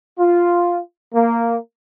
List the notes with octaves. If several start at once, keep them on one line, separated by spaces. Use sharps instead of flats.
F4
A#3